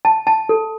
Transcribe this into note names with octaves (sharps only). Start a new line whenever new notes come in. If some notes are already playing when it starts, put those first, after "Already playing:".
A5
A5
A4